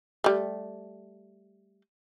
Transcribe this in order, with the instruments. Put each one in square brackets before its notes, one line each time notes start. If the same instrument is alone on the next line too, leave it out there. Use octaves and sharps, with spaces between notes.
[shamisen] G3 A3